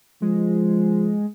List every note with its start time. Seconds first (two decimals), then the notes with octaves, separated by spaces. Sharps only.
0.22 F3 G#3